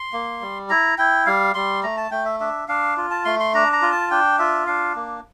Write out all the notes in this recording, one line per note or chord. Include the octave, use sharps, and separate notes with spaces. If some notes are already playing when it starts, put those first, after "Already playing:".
Already playing: C6
A#3
G3
E4 A#5
E4 G5
G3 F5
G3 C6
A3 A#5
A5
A3 G5
E5
D4 E5
D4 F5
F4
A5
A3 C6
C6
D4 A#5
A#5
F4
A5
D4 G5
F4 E5
D4 F5
A#3